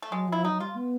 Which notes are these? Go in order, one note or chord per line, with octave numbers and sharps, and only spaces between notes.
A3
F#3 G#3
F3 E4
F#3 D#4
G3 F4
B3